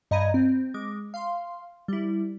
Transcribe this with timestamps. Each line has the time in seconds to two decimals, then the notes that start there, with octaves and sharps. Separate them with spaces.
0.11 G2 D#5 A#5 B5 G#6 D#7
0.34 C4
0.74 G#3 D6
1.14 F5 C6
1.88 G3 E4